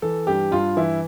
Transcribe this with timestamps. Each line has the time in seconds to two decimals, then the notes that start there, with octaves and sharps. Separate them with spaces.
0.02 E3 A4
0.27 G2 G4
0.51 G2 F4
0.76 E3 E4